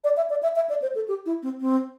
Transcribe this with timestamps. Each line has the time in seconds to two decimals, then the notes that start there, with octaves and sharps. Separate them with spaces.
0.04 D5
0.17 E5
0.30 D5
0.43 E5
0.56 E5
0.69 D5
0.82 C5
0.95 A4
1.08 G4
1.26 E4
1.43 C4
1.60 C4